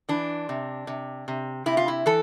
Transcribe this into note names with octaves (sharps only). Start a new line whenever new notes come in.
E3 D4
C3
C3
C3
C3 E4
F4
E4
E3 A4